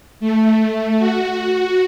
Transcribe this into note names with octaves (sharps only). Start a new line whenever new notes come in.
A3
F#4